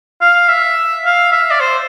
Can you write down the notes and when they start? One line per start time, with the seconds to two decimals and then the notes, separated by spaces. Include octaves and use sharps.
0.21 F5
0.49 E5
1.06 F5
1.32 E5
1.51 D5
1.61 C5